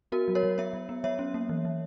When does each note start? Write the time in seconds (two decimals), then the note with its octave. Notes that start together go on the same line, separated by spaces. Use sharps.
0.12 B3 F#4 A#4
0.28 F#3
0.35 A#4 C#5
0.43 F#3
0.58 B3 C#5 E5
0.73 F#3
0.89 B3
1.04 F#3 C#5 E5
1.19 C#4
1.34 A#3
1.49 E3
1.65 E3